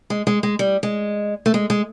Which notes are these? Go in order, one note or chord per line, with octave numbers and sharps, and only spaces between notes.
G#3
G#3
G#3
G3
G#3
A3
G#3
G#3